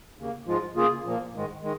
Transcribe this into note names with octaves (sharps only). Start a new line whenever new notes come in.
D#2 C#3 A#3
G#2 F3 G#3 F4
C#3 A#3 F4 G#4
A#2 F3 A#3
G#2 D#3 G#3
D#3 G#3